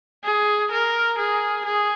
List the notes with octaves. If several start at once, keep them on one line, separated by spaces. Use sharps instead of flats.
G#4
A#4
G#4
G#4